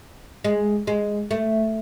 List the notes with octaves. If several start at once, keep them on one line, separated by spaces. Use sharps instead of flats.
G#3
G#3
A3